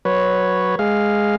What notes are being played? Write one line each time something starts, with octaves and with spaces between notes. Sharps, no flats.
F#3 B4 C#5
G#3 F5